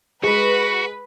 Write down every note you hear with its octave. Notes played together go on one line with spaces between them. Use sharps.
G#3 F#4 B4